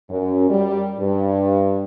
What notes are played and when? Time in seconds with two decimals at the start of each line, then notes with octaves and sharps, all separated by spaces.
0.10 F#2
0.50 G3
1.00 G2